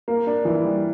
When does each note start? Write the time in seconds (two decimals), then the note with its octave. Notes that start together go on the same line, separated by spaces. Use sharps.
0.08 A#3
0.27 D4
0.45 E3
0.64 G3